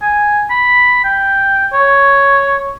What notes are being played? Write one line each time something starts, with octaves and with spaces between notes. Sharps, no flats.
G#5
B5
G5
C#5